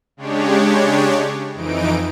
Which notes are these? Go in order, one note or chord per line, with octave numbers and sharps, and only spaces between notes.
C#3 G#3 D4 G4 C#5
F2 E3 D#4 D7